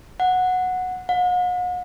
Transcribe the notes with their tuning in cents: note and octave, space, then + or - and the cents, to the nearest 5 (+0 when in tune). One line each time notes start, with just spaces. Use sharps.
F#5 -10
F#5 -45